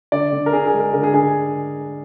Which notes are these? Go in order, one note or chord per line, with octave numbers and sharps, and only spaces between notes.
D3 D5
D3
A#4
D4 G#4
G#4
G#3
A#4
D3 A#4
G#4
D3 G#4